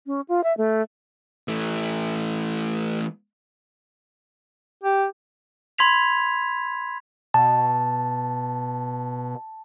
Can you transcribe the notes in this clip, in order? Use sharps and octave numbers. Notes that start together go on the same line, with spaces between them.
C#4
F4
E5
A3
E3 A3
G4
B5 C6 G#6 B6 F7
B2 A5